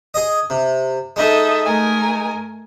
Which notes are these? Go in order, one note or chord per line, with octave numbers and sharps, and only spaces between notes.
G#4 D#5
C3
G#3 D#4 A4 D#5 E5
A3 A#4 G#5